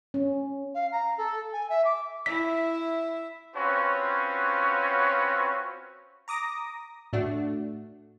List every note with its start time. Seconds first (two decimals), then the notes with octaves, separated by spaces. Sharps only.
0.14 C#4
0.74 F5
0.92 A#5
1.18 A4
1.53 G#5
1.70 E5
1.85 D6
2.26 E4 E5 B6
3.56 C4 C#4 F4 F#4 B4 C#5
6.28 A#5 D6 D#6 A#6
7.13 A2 A3 D4 F#4